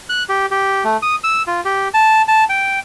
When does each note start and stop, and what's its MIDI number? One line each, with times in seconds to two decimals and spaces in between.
0.09 0.23 90
0.29 0.46 67
0.51 0.84 67
0.84 0.97 57
1.02 1.16 87
1.24 1.43 88
1.47 1.61 65
1.65 1.88 67
1.94 2.22 81
2.28 2.44 81
2.49 2.79 79